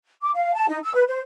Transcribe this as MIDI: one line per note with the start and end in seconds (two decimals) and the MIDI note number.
0.22 0.30 86
0.34 0.51 77
0.54 0.65 81
0.68 0.77 63
0.83 0.91 88
0.94 1.03 71
1.07 1.19 72